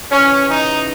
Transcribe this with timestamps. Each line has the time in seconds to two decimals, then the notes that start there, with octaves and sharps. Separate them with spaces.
0.10 C#3 E3 C#4
0.47 D#4